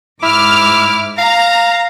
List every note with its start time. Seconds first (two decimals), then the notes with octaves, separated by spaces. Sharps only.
0.23 G#2 E4 D6 F6
1.18 F5 A#5